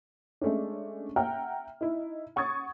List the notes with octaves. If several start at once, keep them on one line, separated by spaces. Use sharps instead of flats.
G#3 A3 C#4 D4
E5 F#5 G5 A#5 F6
D#4 E4
F#5 C#6 D#6 G#6 A6